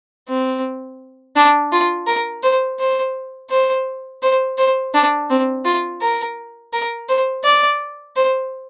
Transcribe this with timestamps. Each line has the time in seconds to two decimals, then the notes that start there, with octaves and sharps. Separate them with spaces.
0.29 C4
1.36 D4
1.72 F4
2.08 A#4
2.43 C5
2.80 C5
3.51 C5
4.23 C5
4.58 C5
4.94 D4
5.30 C4
5.66 F4
6.02 A#4
6.73 A#4
7.09 C5
7.45 D5
8.16 C5